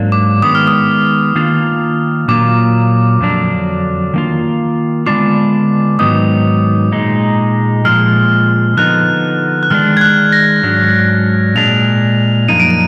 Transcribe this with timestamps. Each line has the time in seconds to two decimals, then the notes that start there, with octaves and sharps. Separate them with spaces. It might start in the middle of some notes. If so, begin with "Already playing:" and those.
Already playing: G#2 F#3 A#3 D4
0.12 D6
0.42 D#3 G#3 B3 D#6
0.55 F6
0.67 D#6
1.35 D#3 A#3 D4 F4
2.28 A#2 F#3 A#3 F4 D6
3.21 F2 D3 F#3 D4
4.14 D#3 A#3 F4
5.06 D3 G#3 B3 D4 F4 D6
5.99 G#2 D#3 F#3 B3 D#4 D#6
6.92 A#2 G#3 D#4
7.85 A#2 F3 G#3 F6
8.77 D3 F3 B3 D#4 F#6
9.63 F#6
9.70 D#3 G#3 D4 F6
9.97 G#6
10.01 F#6
10.32 A#6
10.63 G#2 F#3 D4
11.55 A#2 G#3 D4 F7
12.48 F#2 F3 A#3 D#4 D#7
12.60 D7
12.70 D#7